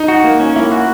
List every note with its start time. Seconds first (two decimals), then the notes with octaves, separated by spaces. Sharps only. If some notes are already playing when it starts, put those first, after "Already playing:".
Already playing: D#4
0.08 F#4
0.24 A#3
0.40 C#4
0.56 A#3 E4
0.72 F#4